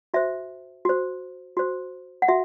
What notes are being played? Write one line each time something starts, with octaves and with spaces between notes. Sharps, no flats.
F#4 C5 E5
F#4 C5
F#4 C5
F#5
F#4 E5